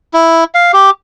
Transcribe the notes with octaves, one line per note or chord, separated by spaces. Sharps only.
E4
F5
G4